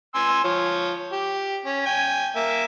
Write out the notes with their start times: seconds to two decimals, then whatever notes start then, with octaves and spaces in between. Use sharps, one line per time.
0.15 G#5 C6 E6
0.44 F3 C#5
1.12 G4
1.65 C#4
1.86 G5 G#5
2.36 A#3 E5